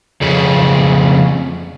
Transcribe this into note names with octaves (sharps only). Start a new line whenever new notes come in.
F2 C#3